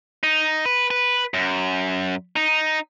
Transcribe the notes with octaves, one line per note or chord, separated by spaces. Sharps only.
D#4
B4
B4
F#2
D#4